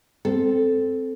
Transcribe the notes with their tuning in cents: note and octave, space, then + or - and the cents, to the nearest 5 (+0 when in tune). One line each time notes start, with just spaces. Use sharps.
C4 +0 A4 +0